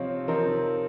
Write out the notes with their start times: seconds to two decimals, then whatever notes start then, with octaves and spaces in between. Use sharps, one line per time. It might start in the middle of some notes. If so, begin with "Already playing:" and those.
Already playing: C3 F3 C4 D#4 C#5 F5
0.28 C3 F3 C4 D#4 A#4